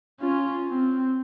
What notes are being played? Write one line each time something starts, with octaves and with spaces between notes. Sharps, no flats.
C#4 F4
C4